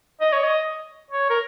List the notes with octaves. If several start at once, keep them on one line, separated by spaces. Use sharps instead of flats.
D#5
C#5
D#5
C#5
A#4